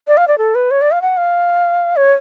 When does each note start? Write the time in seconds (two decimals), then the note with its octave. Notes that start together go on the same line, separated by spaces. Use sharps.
0.08 D5
0.17 F5
0.28 D5
0.38 A4
0.55 B4
0.71 C#5
0.81 D5
0.91 F5
1.02 F#5
1.17 F5
1.96 C#5